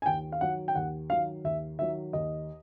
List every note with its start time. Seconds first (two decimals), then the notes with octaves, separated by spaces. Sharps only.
0.02 G#5
0.06 D#2 G5
0.32 F5
0.41 D#3 F#3 F#5
0.68 G5
0.75 D#2 F#5
1.10 D#3 F#3 F5
1.44 D#2 E5
1.79 D#3 F#3 E5
2.13 D#2 D#5